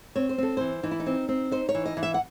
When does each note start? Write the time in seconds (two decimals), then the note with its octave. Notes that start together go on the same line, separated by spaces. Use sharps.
0.16 C4 C#5
0.29 C5
0.38 C4 A4
0.57 E3 C5
0.83 E3 D#4
0.91 E4
1.00 D#4
1.06 C4
1.29 C4
1.52 D#4 C5
1.69 C#5
1.75 E3
1.86 D#5
1.97 E3
2.03 E5
2.14 F#5